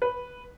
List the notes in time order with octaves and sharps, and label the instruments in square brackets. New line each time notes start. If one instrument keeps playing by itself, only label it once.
[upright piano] B4